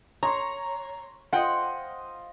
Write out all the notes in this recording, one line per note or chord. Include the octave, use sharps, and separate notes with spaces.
C#5 A#5 C6
F4 C5 D#5 F#5 G5